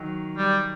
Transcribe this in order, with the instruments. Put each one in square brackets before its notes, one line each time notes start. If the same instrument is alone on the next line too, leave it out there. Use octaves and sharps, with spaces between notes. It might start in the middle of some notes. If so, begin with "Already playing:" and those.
Already playing: [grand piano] D#3 F#3
[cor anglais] G3